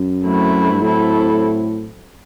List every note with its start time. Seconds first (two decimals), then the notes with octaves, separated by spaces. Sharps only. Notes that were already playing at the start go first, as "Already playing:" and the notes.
Already playing: F#2
0.23 F#3 A3 C4 E4
0.71 G2
0.82 A2 F#3 C4 E4 A4